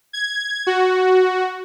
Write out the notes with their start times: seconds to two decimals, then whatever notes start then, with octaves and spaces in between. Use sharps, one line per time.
0.13 G#6
0.67 F#4